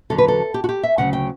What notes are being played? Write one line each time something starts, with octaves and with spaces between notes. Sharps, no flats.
E2 D3 F#3 A4
B4
A4
G4
F#4
G4
E5
D2 C#3 F#3 F#5
G5